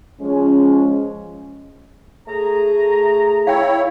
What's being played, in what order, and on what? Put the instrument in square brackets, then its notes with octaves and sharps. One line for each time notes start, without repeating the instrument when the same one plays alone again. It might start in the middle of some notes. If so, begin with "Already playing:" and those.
[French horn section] F3 G#3 C#4
[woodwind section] A3 G#4 A#5
[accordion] E4 C#5 [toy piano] F5 G5